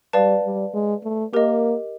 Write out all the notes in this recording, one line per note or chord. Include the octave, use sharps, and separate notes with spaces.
G3 B4 D5 F5 A5
G3
G#3
A3
A#3 G4 A#4 D#5